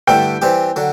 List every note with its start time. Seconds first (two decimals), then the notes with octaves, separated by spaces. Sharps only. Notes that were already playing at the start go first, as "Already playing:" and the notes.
0.07 G2 D3 A3 E4 G5
0.42 E3 G3 C4 G4
0.76 D3 F#3